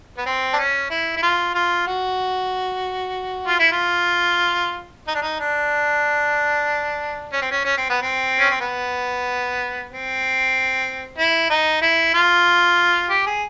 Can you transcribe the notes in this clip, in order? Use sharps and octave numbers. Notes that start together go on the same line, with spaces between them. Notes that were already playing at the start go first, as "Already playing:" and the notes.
B3
C4
D4
C#4
E4
E4
F4
F4
F#4
F4
E4
F4
D#4
D4
D#4
D4
C#4
C4
C#4
C#4
C4
B3
C4
C#4
C4
B3
C4
E4
D#4
E4
F4
G4
G#4